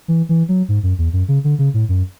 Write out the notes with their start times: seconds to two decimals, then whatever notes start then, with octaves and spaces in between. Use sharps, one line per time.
0.08 E3
0.29 E3
0.48 F#3
0.69 G#2
0.83 F#2
0.98 E2
1.13 F#2
1.28 C#3
1.44 D3
1.59 C#3
1.74 A2
1.89 F#2